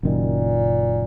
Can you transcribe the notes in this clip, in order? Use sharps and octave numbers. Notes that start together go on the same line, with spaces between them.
F#1 F#2 A#2 D#3